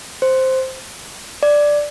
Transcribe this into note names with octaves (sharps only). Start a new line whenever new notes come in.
C5
D5